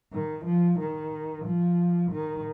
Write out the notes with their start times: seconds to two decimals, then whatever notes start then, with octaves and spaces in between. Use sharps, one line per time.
0.13 D#3
0.45 F3
0.79 D#3
1.45 F3
2.11 D#3